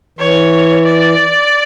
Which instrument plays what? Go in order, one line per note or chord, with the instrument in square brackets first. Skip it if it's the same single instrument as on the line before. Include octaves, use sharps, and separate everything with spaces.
[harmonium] E3 [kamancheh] C#5
[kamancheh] D5